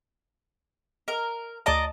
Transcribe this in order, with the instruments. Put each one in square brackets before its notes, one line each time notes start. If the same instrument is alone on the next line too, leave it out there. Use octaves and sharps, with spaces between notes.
[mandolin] A#4 [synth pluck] D#5
[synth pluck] D2 A5 [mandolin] D5 D#5 A#5